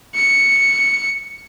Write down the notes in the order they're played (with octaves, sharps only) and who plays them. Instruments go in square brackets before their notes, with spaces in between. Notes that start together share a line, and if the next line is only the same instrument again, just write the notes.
[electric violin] C#7